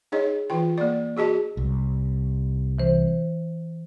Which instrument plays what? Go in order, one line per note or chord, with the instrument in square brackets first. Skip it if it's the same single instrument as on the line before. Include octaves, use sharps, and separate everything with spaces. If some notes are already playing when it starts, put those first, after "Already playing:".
[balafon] D#4 G#4 C#5 D#5
E3 F4 G5
A#3 D5
F#4 G#4 D#5 A5
[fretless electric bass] C2
[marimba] E3 C5